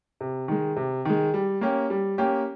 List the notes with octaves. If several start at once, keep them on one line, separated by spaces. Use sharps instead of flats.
C3
D#3 G#3
C3
D#3 G#3
G3
A#3 C#4 G4
G3
A#3 C#4 G4